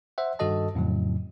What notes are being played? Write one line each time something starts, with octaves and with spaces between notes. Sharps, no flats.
C5 E5 F#5
G2 D#3 F#4 A4 D#5 A5
F2 A2 C#3 F#3